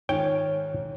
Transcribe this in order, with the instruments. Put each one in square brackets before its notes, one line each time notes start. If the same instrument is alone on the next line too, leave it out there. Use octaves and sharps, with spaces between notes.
[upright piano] G#2 [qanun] D#3 C#4 F4 [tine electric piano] C#5 [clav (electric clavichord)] G5